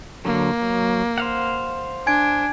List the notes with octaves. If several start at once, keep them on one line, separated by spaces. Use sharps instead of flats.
D3 F#3 A#3
F#3
C5 F5 F#5
D4 G#5 G#6 D7